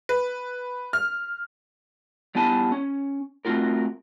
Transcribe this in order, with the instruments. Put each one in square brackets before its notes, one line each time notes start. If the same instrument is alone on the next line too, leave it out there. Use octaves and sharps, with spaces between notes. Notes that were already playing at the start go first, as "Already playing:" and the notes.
[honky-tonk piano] B4
F6
[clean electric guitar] G3 B3 E4 G#5 A5
C#4
A3 C4 C#4 F4 F#4 A#4